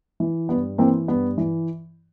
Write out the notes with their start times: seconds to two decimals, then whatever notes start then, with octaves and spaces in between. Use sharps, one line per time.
0.20 E3
0.49 G2 B3
0.78 E3 A#3 C4
1.08 G2 B3
1.38 E3